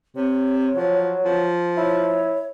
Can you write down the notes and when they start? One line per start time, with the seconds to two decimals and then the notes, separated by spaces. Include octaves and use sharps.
0.16 C3 C#5
0.76 F3 F#3
1.25 F3
1.77 E4 C#5